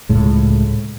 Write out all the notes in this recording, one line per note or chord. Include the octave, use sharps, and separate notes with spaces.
C#2 A2 G#3